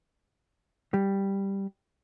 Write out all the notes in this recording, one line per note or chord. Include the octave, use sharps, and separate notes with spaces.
G3